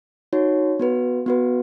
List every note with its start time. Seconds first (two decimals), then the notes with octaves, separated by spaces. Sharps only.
0.33 D#4 F#4 C#5
0.79 B3 F#4 B4
1.26 B3 F#4 B4